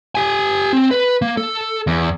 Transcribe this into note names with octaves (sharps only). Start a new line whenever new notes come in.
G4 G#5
C4
B4
A#3
A4
E2